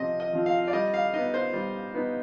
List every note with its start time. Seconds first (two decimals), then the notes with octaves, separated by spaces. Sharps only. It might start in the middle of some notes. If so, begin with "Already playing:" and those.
Already playing: C3 F3 C4 F4 D#5
0.20 D#5
0.33 F3 C4 F4
0.46 F5
0.68 D5
0.73 G3 D#5
0.94 F5
1.14 B3 D#4 D#5
1.34 C5
1.53 G3
1.95 B3 D#4